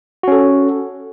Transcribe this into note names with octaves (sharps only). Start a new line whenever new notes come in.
C#4 F#4 A4